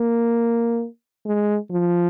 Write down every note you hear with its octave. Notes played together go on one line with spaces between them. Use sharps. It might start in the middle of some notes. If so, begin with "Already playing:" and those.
Already playing: A#3
G#3
F3